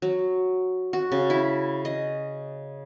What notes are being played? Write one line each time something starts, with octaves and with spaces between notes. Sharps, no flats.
F#3
F#4
C#3
E4
D#5